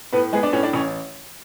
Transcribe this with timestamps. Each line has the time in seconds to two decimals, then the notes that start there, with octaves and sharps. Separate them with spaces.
0.13 A2 B3 B4
0.33 G#3 B3 G#4
0.43 D4 D5
0.53 A2 C#4 C#5
0.63 D4 D5
0.73 A1 C#4 C#5